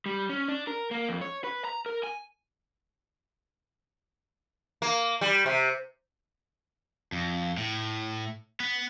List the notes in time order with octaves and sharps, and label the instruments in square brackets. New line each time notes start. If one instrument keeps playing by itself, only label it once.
[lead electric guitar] G3
C#4
D4
A#4
A#3
F2
C#5
B4
A#5
A#4
G#5
[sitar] A#3
G3
C3
[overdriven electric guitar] F2
A2
B3